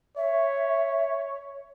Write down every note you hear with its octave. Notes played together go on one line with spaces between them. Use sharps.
C#5 E5